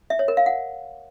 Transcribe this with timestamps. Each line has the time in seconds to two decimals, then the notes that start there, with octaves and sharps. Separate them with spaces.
0.10 E5
0.19 C#5
0.28 A#4
0.37 F5
0.46 F#5